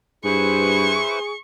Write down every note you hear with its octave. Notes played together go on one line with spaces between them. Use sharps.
G2 E4 G#4 B4 C5 C#6